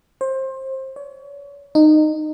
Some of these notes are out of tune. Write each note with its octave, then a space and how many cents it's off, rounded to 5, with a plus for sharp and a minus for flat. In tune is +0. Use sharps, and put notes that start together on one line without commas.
C5 +25
C#5 +35
D#4 -20